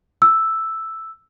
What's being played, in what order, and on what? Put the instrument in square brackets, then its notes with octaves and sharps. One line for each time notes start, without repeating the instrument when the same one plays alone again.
[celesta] E6